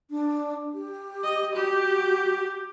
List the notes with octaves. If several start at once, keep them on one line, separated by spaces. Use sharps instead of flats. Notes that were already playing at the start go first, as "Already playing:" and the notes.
D4
G4
D#5
F#4 G4